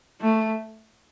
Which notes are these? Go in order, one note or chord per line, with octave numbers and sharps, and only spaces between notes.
A3